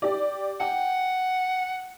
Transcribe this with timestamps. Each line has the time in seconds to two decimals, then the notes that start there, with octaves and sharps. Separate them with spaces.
0.02 G4 D5
0.60 F#5 G5